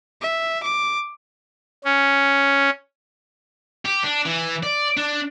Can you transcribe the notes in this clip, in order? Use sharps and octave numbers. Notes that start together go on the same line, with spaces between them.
E5
D6
C#4
G4
D4
E3
D5
D4